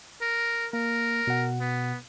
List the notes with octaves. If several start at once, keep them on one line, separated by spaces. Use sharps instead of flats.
A#4
A#3 A#4
B2 F#5
B3